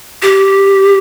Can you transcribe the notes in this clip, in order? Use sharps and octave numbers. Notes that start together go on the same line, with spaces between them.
G4